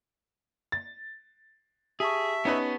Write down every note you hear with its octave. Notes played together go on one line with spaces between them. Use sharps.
A6
G4 G#4 E5 A5 C#6
B3 C#4 D#4 B4